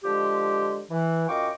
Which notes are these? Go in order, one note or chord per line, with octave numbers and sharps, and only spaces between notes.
D3 F3 G#3 G4
E3
F#2 F4 D#5 G5 C#6 D6